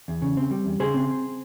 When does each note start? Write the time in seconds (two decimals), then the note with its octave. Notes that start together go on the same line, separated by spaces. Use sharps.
0.08 E2
0.22 C#3
0.37 C4
0.51 G3
0.66 E2
0.80 C#3 G#4 C5
0.94 C4